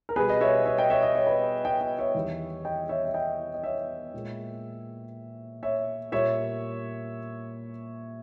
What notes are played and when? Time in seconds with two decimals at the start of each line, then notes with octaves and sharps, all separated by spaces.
0.09 A#4
0.16 B2 G3 G#4 B4
0.29 D#5
0.41 C#5 E5
0.66 C#5 E5
0.78 D#5 G5
0.90 C#5 E5
1.03 D#5
1.15 C#5
1.27 B4 D#5
1.65 D#5 G5
1.81 D#5 G5
1.99 C#5 E5
2.15 E2 D#3 G3
2.65 D#5 G5
2.89 C#5 E5
3.05 E5
3.14 D#5 G5
3.54 D#5
3.64 C#5 E5
4.14 A#2 G#3
5.63 C#5 E5
6.12 A#2 G3 C#5 E5